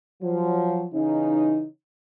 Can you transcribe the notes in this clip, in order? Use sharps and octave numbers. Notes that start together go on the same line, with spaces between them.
F3 F#3
C#3 E3 C#4 D#4